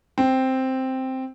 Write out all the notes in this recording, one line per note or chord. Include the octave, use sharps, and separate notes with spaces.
C4